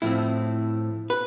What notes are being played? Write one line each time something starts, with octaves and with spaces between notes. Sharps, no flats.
A2 F3 C4 E4
B4